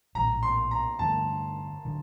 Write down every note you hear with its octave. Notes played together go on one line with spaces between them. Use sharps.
A#1 A2 F#3 A#5
C6
A#5
G2 D3 A3 A5
D3 F#3